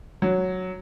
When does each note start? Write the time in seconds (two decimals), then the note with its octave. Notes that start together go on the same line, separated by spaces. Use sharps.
0.22 F#3